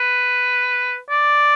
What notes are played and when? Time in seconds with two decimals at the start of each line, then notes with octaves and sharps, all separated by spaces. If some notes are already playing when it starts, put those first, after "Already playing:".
Already playing: B4
1.10 D5